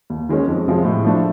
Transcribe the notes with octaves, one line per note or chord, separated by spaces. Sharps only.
D#2
D#3 G#3 C#4
F2
C3 F3 G#3
A2
F3 A3 D4